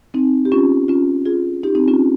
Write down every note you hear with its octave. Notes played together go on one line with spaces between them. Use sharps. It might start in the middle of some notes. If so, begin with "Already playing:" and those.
C4 D#4
G4
C#4 F4
C#4 F4
F4 G#4
D#4 G4
C4 D#4
C#4 F4